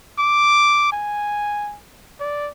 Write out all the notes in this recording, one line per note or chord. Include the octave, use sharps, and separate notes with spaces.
D6
G#5
D5